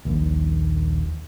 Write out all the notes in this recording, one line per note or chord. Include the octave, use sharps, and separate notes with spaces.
D#1 A#1 D#2